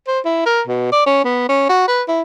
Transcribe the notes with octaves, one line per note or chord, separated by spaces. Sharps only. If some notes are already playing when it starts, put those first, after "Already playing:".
C5
E4
A#4
B2
D5
C#4
B3
C#4
F#4
B4
E4